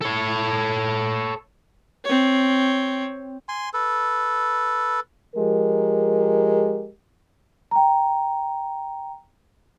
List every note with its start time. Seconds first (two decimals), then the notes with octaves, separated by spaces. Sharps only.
0.02 A4 C#5
2.05 C4 C#5
3.49 G#5 C6
3.74 A4 B4
5.36 F3 G#3 G4 A#4
7.71 G5 A#5